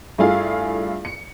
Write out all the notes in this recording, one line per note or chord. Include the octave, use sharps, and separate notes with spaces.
G2 A3 E4 F4 G#4 F5
C#7